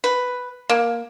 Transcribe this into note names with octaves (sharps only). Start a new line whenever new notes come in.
B4
A#3